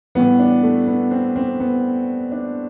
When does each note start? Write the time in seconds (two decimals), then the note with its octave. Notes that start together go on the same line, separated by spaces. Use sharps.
0.15 A2 E3 G3 B3
0.39 D4
0.63 A3
0.87 B3
1.11 C4
1.36 C4
1.60 B3
2.32 D4